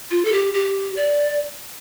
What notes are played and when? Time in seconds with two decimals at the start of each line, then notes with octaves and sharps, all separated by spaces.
0.11 F4
0.25 A4
0.32 G4
0.54 G4
0.96 D5